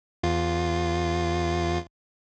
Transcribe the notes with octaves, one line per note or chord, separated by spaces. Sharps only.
E2 F4